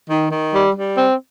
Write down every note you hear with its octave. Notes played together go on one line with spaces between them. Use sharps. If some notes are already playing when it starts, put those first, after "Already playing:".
D#3
D#3
G3
G3
C4